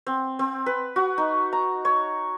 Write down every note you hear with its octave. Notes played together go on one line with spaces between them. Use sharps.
C4
C4
B4
F#4
D#4
A#5
C#5